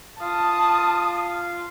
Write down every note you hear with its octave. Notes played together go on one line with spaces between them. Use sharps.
F4 F5 A5 D#6